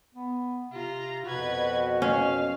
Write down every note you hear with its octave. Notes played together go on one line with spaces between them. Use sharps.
B3
C3 F4 A#5
F2 B2 F#4 B4 G#6
C#4 F5